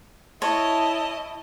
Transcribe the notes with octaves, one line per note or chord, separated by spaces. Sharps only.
E4 C#5 D#5 A5